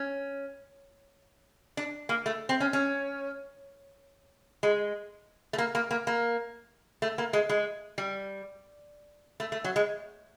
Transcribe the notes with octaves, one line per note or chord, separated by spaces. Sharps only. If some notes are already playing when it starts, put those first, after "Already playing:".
Already playing: C#4
D4
A#3
A3
C4
C#4
C#4
G#3
A3
A#3
A#3
A#3
A#3
A3
A#3
G#3
G#3
G3
A3
A3
F#3
G#3